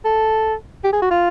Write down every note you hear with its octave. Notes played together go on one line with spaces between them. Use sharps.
A4
G4
G#4
F#4
F4